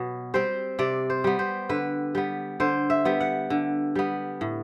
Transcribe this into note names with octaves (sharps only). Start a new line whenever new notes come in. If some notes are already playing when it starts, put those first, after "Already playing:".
Already playing: B2 F#3 B3
G3 C4 C5
C3 D5
C5
G3 B3
C5
D3 B4
G3 B3
D3 C5
E5
G3 B3
F#5
D3
G3 B3
A2